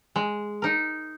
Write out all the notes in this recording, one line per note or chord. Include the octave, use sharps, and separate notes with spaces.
G#3
D#4 A#4